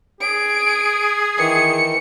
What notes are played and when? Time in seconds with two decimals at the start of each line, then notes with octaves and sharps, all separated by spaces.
0.21 G#4 D7
1.38 D#3 E3 C#7